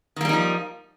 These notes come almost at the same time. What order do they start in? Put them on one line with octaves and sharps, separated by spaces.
D#3 A#3 G3 D#4 F3